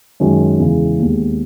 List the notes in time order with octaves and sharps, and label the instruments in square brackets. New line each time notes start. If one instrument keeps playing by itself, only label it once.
[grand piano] F#2 D#3 G#3 C#4 F#4
E2 C#3 E3 G#3
D#2 D#3 G#3 B3